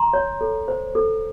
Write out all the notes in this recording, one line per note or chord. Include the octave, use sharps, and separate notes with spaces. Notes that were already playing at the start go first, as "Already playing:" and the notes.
Already playing: A#5 C6
C#5
A4
C5
A4